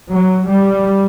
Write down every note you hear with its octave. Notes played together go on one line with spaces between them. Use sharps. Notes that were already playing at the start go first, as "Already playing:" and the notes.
F#3
G3